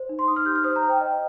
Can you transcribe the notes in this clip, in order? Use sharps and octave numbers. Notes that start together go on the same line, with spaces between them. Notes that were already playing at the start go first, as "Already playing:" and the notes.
Already playing: C5
D#4
C6
D#4 D#6
F6
G4 G6
F6
C5 D#6
A#5
C5
G5
C5 D#5